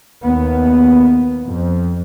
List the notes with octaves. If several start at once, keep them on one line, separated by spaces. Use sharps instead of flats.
D#2 B3
F2